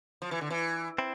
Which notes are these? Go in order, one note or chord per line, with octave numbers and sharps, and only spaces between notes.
F3
E3
D3
E3
C4 E4